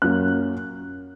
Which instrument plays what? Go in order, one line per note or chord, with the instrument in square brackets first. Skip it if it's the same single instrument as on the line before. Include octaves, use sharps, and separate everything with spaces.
[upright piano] F#2 F#3 A#3 F#6